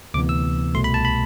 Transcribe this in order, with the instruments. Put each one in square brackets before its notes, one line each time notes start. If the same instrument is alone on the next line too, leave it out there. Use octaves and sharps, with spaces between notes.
[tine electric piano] D2 C3 E3 B3 D6
E6
C2 B2 A3 C6
B5
A5
B5